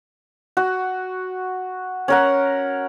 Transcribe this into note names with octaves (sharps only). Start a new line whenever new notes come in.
F#4
C#4 A#4 F#5